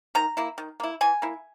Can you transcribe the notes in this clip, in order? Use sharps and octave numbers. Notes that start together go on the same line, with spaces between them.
D#3 A#5
A#3 E4
D#3
A#3 E4
E3 G#5
A#3 E4